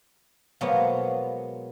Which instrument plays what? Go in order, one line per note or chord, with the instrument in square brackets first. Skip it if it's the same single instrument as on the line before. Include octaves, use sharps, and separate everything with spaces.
[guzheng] B2 F3 F#3 G#3 A#3 B3